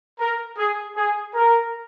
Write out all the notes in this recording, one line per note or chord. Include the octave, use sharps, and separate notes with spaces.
A#4
G#4
G#4
A#4